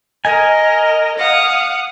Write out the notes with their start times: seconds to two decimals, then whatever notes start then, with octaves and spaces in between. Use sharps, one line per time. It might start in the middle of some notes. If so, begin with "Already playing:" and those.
0.25 A#4 D#5 G#5
1.17 F5 F#5 D#6